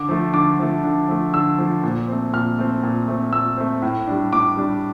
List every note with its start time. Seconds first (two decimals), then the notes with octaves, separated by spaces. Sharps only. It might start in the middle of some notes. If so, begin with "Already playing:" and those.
Already playing: D3 D6
0.09 F3 A3
0.34 D3 D6
0.59 F3 A3
0.84 D3
1.09 F3 A3
1.33 D3 E6
1.58 F3 A3
1.84 A#2
2.08 A3 C4
2.33 A#2 F6
2.58 A3 C4
2.83 A#2
3.08 A3 C4
3.32 A#2 E6
3.57 A3 C4
3.82 A2
4.07 G3 D4
4.33 A2 D6
4.57 G3 D4